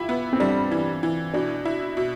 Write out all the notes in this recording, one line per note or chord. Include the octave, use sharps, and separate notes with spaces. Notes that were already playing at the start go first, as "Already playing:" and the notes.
Already playing: E4 F4 G4
B3
C4
G3 D4
E3
E3
B2 D4
E4
B2